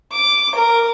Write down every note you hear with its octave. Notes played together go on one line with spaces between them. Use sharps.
D6
A#4